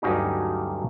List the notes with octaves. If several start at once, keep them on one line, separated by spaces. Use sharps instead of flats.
D2 G2 F#3 C#4 D#4 G4